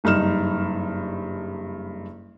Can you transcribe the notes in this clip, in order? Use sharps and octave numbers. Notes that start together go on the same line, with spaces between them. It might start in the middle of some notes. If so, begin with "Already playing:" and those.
F#1 G2 D#4 F6 E7